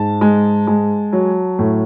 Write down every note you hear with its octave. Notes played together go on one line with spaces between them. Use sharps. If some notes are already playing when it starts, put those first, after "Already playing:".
Already playing: G#2 A5
G#3
G#3
F#3
A2